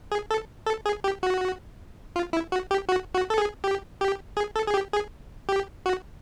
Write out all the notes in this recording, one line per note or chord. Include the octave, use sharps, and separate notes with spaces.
G#4
A4
A4
G#4
G4
F#4
F4
E4
F#4
G4
F#4
F#4
A4
G#4
G4
G4
G#4
A4
G#4
G4
G#4
G4
F#4